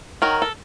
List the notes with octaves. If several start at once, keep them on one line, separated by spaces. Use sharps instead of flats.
D#3 F#3 A#4
A4